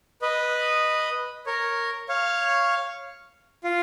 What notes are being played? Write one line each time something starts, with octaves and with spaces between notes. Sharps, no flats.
B4 D#5
A#4 C#5
C#5 F5
F4